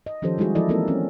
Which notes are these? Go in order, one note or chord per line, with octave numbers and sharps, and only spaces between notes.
D#5
D#3 F3 C#4 G4 A4 C5
G3 G#3 D#4 E4 F#4 G#4
E3 F3 E4 A4 D5 D#5
A#3 C4 D#4 E4 A4 A#4
C4 C#4